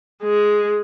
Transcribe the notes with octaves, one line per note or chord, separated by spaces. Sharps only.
G#3